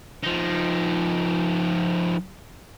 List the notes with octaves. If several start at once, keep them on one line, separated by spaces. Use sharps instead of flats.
F3 D#4